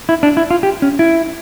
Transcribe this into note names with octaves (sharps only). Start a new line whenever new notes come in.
E4
D4
E4
F4
G4
C#4
E4